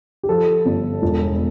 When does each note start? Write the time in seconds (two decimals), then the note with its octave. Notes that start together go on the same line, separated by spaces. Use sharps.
0.23 G4
0.29 F3 A4
0.65 G1
1.02 E1